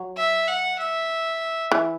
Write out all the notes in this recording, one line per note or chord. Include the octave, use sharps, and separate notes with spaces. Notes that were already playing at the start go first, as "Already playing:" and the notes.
Already playing: F#3
E5
F#5
E5
E3